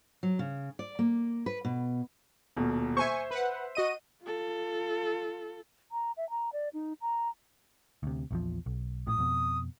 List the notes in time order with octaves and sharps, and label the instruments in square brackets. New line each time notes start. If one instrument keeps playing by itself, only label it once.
[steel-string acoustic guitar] F#3
C#3
D5
A#3
B4
B2
[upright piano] D#1 B2
[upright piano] C5 E5 [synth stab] G#5 C#6
[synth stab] B4 F#5
F#4 D#5 D#7
[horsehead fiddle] F4 A4
[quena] A#5
E5
A#5
D5
D#4
A#5
[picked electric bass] D2 C3
A#1 E2 F3
B1
[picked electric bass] A#1 A2 [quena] D#6
[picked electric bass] F2 B2